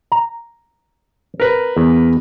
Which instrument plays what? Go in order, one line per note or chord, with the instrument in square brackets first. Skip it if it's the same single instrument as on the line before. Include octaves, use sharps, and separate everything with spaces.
[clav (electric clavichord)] A#5
[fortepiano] A#4 B4
[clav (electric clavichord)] E2